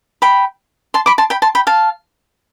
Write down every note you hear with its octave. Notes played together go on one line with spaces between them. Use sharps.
G5 B5
A5 C6
B5 D6
A5 C6
G5 B5
A5 C6
G5 B5
F5 A5